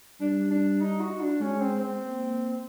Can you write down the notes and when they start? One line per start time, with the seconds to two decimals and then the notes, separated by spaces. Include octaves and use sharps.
0.20 G3 D4
0.50 D4
0.81 D#4
1.00 F#4
1.21 D4
1.40 G#3 C#4
1.60 C4
1.80 C4
2.01 A#3